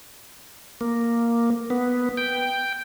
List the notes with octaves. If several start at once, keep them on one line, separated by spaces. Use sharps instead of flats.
A#3
B3
G5